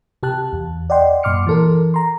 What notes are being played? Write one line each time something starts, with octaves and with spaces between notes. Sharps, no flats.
C3 G4 A5 F#6
E2
D5 D#5 F#5 G5 C6
F#2 A#2 C6 D6 F6 C#7
E3 A4 A#4
A#5 C6